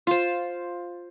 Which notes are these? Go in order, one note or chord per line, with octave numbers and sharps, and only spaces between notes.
F4 C5